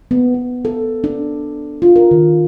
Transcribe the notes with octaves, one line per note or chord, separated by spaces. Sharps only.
B3
B3
A4
D4
F4
A#4
D#3